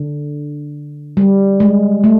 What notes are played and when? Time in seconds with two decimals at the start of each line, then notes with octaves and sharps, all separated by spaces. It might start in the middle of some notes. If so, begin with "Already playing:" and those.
Already playing: D3
1.17 G3
1.60 G#3
2.04 A3